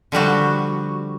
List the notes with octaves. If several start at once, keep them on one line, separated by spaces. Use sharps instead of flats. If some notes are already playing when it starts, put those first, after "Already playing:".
D3 F3 G3 F#4